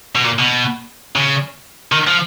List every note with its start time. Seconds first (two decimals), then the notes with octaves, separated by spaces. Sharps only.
0.15 B2
0.25 A#2
0.39 B2
1.16 C#3
1.92 D#3
2.07 F3